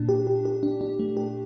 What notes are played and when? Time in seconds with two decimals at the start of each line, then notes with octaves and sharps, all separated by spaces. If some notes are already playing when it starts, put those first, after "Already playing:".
Already playing: A#2 D4
0.09 G4
0.27 G4
0.45 G4
0.63 D4
0.81 D4
0.99 A3
1.17 G4